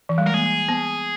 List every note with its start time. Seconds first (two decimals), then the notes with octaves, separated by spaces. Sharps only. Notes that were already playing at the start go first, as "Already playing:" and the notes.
0.09 E3
0.18 G3
0.26 G#3 A#4
0.34 A#3 G#4
0.69 B3